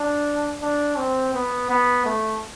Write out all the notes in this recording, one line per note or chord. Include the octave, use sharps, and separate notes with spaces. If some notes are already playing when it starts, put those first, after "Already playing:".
Already playing: D4
D4
C4
B3
B3
A3